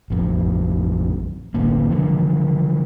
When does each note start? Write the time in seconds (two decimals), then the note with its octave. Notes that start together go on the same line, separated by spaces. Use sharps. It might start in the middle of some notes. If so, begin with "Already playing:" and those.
0.10 A1 F2
1.54 F1 A2 D3 A#3
1.90 D3 E3 F3